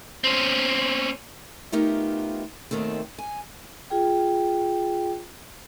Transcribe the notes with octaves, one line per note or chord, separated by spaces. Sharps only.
C4 C#4
A3 B3 D#4 F4 G4 A#4
D#2 B2 D#3 A3 C4
G#5
F4 G#4 G5